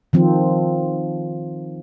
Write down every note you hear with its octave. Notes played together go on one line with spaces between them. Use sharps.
D#3 F3 C4